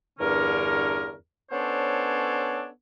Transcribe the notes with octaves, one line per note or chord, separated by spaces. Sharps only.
E2 G2 D3 C#4 A#4
B3 C#4 D4 A4 C5 C#5